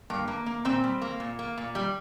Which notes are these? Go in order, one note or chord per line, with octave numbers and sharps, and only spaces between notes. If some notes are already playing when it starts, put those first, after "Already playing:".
G2 A#3
A#3
A#3
A#2 C4
G3
A#3
A#2
A#3
A#2
G3